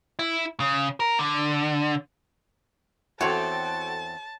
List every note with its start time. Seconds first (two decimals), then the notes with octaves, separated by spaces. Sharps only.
0.19 E4
0.60 C#3
1.00 A#4
1.19 D3
3.21 E2 C4 F#4 A4 C#5 G5 A5